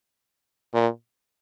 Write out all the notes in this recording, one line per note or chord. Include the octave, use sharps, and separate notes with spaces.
A#2